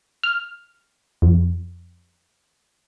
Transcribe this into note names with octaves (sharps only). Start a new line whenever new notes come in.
F6
F2